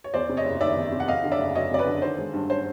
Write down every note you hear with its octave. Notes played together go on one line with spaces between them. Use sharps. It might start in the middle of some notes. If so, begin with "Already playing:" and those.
C#5
E2 C5 D5
C3
C#5 D#5
F#1
D#3 D5 E5
E2
C3
F#5
F2 D#5 F5
D3
D5 E5
F#1
F#3 C#5 D#5
F2 D5
B4 C#5
D3
D#3 C5
G#3
G2
C#4 C5